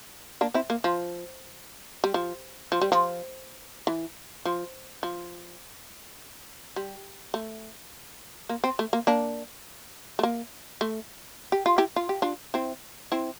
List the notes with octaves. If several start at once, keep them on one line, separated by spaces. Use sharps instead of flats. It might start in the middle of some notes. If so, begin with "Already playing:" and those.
A#3 D4
C4 E4
A#3
F3
G3
F3
F3
G3
F3
E3
F3
F3
G3
A3
A#3
C4
A3
A#3
A#3 D4
A3
A#3
A3
G4
F4
E4 G4
F4
G4
D4 F4
C4 E4
C4 E4